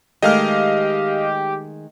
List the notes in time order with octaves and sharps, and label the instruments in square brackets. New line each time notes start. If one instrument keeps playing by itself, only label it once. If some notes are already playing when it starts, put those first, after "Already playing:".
[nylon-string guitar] D#3 G#3 A3 [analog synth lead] G4 [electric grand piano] D#5 F5 F6